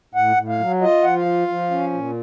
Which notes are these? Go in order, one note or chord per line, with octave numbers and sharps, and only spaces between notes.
A2 F#5
A2
F5
F#3
F4 D#5
F3 F#5
F5
F4
F3
C#4
A#2